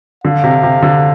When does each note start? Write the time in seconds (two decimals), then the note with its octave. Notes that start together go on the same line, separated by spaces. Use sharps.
0.24 D3 F5
0.44 C3
0.63 C3
0.82 D3